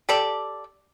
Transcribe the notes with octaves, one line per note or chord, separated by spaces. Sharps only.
G4 A4 D5